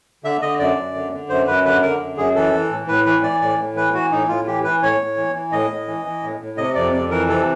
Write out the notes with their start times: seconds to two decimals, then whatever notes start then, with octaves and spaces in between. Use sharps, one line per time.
0.24 D3 E5
0.41 D3 D#5
0.59 F#2 D5
0.76 F#2
0.95 D3
1.12 D3
1.29 F#2 C5
1.47 F#2 B4
1.65 D3 B4
1.82 D3 A#4
2.00 F#2
2.17 F#2 G#4
2.35 E3 A4
2.53 E3
2.70 A2
2.88 A2 B4
3.05 E3 B4
3.23 E3 D5
3.41 A2 D5
3.59 A2
3.76 E3 B4
3.94 E3 F#4
4.11 A2 D#4
4.28 A2 F4
4.47 E3 G4
4.64 E3 B4
4.82 A2 C#5
5.00 A2
5.17 E3
5.34 E3
5.52 A2 D#5
5.71 A2
5.88 E3
6.05 E3
6.23 A2
6.40 A2
6.57 C3 D#5
6.75 F2 D5
6.93 F2 D5
7.10 E3 A#4
7.28 C3 A4